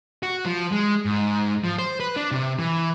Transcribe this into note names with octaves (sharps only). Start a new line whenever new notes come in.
F#4
F3
G#3
G#2
F3
C5
B4
D4
C3
E3